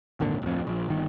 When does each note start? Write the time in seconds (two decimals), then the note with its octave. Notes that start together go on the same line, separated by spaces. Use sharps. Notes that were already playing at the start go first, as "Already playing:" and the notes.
0.20 D#1 G#1 A#2 D3
0.42 D1 F2
0.67 A#1
0.88 G1 D#3